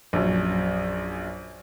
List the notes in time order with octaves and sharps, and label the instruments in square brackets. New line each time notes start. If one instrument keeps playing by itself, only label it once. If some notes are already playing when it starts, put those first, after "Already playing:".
[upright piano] A#1 F#2